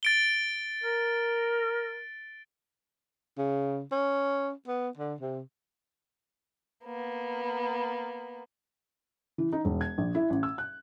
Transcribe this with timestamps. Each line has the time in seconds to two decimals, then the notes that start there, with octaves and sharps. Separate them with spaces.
0.03 A6 D7 G7
0.84 A#4
3.38 C#3
3.92 C#4
4.67 B3
4.97 D3
5.21 C3
6.85 A#3 B3
9.38 E3
9.53 D#4
9.65 E1
9.81 G#6
9.98 A#1
10.15 E4
10.30 A1
10.43 E6
10.58 F#6